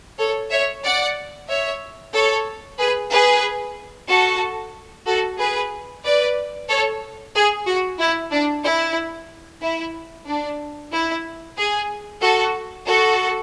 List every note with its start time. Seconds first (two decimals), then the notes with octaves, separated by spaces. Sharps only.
0.18 A4 C#5
0.51 C#5 E5
0.84 D5 F#5
1.49 C#5 E5
2.14 A4 C#5
2.78 G#4 B4
3.11 G#4 B4
4.08 F#4 A4
5.07 F#4 A4
5.39 G#4 B4
6.04 B4 D5
6.69 A4 C#5
7.35 G#4
7.66 F#4
7.99 E4
8.31 D4
8.65 E4
9.62 E4
10.27 D4
10.92 E4
11.58 G#4
12.22 F#4 A4
12.86 F#4 A4